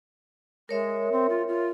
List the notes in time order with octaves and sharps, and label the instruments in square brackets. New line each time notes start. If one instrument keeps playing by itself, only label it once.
[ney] G#3 [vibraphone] A#4 C#5 E5
[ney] C4
F4
F4